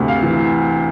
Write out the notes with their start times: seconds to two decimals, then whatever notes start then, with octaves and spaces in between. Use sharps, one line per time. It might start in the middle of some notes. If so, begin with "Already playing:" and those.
Already playing: D2 C3
0.08 F5
0.23 E3